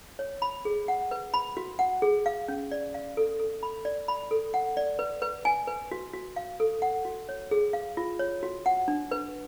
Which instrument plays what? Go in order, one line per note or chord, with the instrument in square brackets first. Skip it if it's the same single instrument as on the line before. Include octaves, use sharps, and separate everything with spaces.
[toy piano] C#5
B5
G#4
F#5
B4
B5
F#4
F#5
G#4
F5
C#4
D5
F5
A4
A4
B5
D5
B5
A4
F#5
D5
B4
B4
G#5
B4
F#4
F#4
F5
A4
F#5
F#4
C#5
G#4
F5
F4
C#5
F#4
F#5
D4
B4